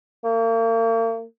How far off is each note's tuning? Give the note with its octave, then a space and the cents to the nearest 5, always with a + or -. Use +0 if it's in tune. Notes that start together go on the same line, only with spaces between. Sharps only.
A#3 -40